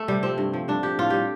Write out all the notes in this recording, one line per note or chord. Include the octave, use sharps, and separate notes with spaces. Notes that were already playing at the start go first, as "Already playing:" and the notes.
Already playing: A3
C3 G3
F3 C4
G2
F3
G2 D4
F3 G4
A2 F4
G3 G4